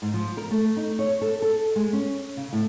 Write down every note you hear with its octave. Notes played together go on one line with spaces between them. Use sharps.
G#2
F3
A#4
A3
D#4
C#5
A4
A4
G#3
C#4
C#3
A2